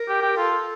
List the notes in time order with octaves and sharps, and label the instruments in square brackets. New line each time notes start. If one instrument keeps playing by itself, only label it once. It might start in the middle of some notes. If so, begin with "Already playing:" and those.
Already playing: [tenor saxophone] A#4
[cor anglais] G4
G4
[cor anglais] F4 [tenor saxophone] A4